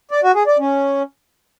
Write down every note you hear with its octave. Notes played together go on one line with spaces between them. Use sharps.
D5
F#4
G#4
D5
C#4